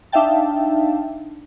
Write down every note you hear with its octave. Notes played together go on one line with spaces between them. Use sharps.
D4 D#4 E5 F5 G5 A5